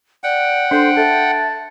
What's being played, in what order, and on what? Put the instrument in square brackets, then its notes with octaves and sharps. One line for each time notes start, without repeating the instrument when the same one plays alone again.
[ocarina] D5 [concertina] F#5 G5
[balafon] D4 [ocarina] A4 [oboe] C5
[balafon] A4 [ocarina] E5 [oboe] A5